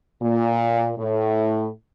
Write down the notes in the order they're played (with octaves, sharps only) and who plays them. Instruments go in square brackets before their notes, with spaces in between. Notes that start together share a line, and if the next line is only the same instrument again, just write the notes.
[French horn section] A#2
A2